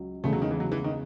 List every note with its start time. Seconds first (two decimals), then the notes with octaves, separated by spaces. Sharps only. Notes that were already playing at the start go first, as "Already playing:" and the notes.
Already playing: C#2 F#3
0.24 E2 C#3 G#3 A3
0.33 F#3
0.42 D#3
0.51 E3
0.60 F#3
0.72 E3
0.84 D#3